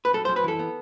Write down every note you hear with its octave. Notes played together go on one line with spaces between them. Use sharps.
B4
F#2 A4
C5
F#2
B4
E3 A4
B3